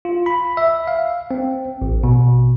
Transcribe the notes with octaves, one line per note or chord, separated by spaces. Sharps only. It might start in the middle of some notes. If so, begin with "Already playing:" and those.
F4
B5
E5
F5
C4
A1
B2